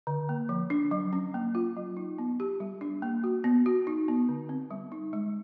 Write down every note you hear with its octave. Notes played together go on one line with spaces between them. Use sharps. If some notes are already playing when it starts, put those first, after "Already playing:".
D3
A#3
F3
D4
F#3
C#4
A#3
F4
F#3
D#4
B3
G4
G3
D4
A#3
F#4
B3
F#4
D#4
B3
D3
C4
G3
D#4
G#3